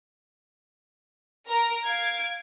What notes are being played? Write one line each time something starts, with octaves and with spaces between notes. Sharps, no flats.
A#4 A#5
F5 G#6 D7